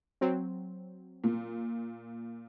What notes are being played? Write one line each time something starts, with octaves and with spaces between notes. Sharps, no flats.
F#3 C4
A#2